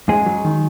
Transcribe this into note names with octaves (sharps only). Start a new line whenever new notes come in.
F#2 G#3 G#4
F#3
D#3